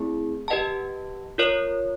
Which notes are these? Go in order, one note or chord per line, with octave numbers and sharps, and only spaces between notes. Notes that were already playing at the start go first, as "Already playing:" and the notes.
Already playing: A3 C4 E4 G#4
G4 B4 D#5 F#5 A5
F4 A#4 C#5